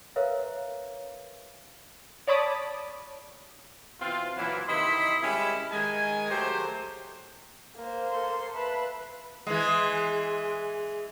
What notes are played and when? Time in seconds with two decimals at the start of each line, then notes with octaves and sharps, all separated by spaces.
0.16 A#4 B4 C#5 E5 F5 A#5
2.27 C#5 D5 A5 B5 D6 D#6
4.00 B2 E3 C4 F4
4.37 A#2 E3 F#3 A#3 E4
4.68 C3 D#3 E4 D#5 B5 C6
5.22 G3 G#3 C#4 E4
5.72 D#3 G#3 G#5
6.31 F#3 A3 G4 C5
7.77 A#3 C5
8.10 A4 C6
8.54 B4 E5 F5 A5
9.47 E3 G#3